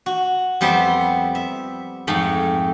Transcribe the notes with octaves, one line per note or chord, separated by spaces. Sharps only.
F#4
F2 G3 B3 C5 E5 C6
E5
F2 G#2 A3